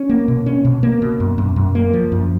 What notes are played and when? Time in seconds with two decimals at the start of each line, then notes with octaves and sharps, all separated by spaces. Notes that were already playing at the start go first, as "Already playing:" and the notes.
Already playing: C#4
0.09 A#3
0.28 B2
0.46 C#4
0.65 B2
0.83 A#3
1.02 B2
1.20 F#2
1.38 F#2
1.56 F#2
1.75 A#3
1.93 F3
2.12 F#2